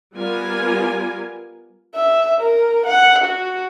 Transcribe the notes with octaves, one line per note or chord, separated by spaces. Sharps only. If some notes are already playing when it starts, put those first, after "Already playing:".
G3 B3 F4 A#4 G#5
E5
A#4
F#5
F#4